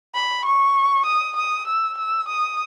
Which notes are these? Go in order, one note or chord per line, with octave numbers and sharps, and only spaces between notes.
B5
C#6
D#6
D#6
E6
E6
D#6